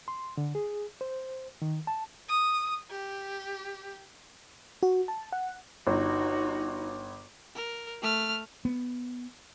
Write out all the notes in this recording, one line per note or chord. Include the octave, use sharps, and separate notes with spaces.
C6
D3
G#4
C5
D#3
A5
D#6
G4
F#4
A5
F#5
G1 D#4 F#4
A#4
A3 F6
B3